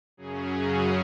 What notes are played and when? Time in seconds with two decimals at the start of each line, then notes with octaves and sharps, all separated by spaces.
0.17 F#2 C#3 F#3 C#4 G#4